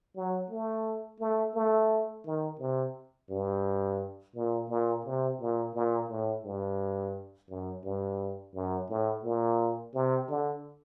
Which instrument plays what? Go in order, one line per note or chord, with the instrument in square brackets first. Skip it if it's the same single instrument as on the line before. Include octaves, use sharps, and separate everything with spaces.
[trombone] F#3
A3
A3
A3
D#3
C3
G2
A#2
A#2
C3
A#2
A#2
A2
G2
F#2
G2
F#2
A2
A#2
C3
D3